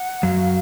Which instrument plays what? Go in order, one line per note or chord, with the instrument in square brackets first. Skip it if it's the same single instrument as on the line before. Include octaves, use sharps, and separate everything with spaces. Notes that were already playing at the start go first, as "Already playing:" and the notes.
Already playing: [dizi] F#5
[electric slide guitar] F#2 F#3 [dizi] F5